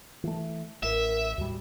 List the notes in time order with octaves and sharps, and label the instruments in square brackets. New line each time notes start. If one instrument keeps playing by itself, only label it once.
[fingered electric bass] E3 A3
[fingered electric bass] A1 [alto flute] A#4 [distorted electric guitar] E5
[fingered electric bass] D#2 A2 G3 [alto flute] F#4